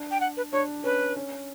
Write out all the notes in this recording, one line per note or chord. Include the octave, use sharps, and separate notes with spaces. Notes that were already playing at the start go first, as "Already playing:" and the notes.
Already playing: D4
G5
F#5
B4
D4 C#5
C#4 B4
C#4